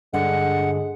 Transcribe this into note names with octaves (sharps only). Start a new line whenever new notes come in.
G2 D3 G#3 F#5